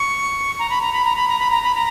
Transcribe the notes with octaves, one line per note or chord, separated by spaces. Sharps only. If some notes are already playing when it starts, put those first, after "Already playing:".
Already playing: C#6
A#5
B5
A#5
B5
A#5
B5
A#5
B5
A#5
B5
A#5